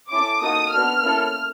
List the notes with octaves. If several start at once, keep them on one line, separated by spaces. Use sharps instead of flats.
C#4 E4 A4 D6
A#3 D#4 F#4 A4 D#6
B3 D4 F#4 A4 F6
A#3 C#4 E4 A4